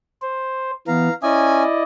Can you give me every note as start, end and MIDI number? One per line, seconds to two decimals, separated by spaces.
0.22 0.71 72
0.87 1.09 52
0.87 1.09 59
0.87 1.14 77
0.87 1.14 82
1.23 1.63 61
1.23 1.83 64
1.23 1.83 74
1.23 1.83 75
1.23 1.63 80